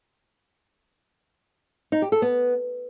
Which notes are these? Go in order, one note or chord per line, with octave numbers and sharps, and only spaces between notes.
D#4
G4
A4
B3